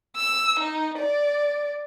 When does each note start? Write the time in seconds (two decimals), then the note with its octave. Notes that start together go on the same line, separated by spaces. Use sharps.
0.16 E6
0.59 D#4
0.98 D5